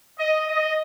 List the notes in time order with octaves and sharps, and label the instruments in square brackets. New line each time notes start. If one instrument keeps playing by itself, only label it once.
[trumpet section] D#5
D#5